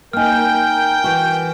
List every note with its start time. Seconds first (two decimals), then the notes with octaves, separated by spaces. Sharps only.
0.13 A#3 D#4 A#4 G5 G#5 F6
1.04 E3 F#4